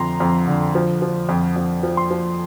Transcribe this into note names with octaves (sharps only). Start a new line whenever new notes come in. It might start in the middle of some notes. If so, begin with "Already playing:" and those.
Already playing: F2 D3 F3 A#5 C6
F2
D3
F3
F3
F2
F2
F3
C6
F3